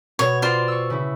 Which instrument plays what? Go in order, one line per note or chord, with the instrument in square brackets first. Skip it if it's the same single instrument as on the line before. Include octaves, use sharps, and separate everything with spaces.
[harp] B2 [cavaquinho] C#5
[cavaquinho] F4 C5 [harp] D5 G5
[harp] C#6 E6
C#3 E4